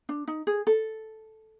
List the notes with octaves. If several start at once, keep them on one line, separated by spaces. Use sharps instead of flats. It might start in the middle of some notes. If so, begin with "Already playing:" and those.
D4
D#4
G#4
A4